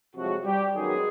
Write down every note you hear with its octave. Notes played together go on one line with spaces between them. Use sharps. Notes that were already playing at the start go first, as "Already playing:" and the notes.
C2 C3 F3 F#3 G#3 F#4
G3 G4
F#2 D#3 F#3 G#3 B3 G#4